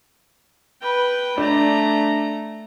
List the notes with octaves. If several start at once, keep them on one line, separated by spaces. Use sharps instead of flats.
B4 G5
A3 D4 A#5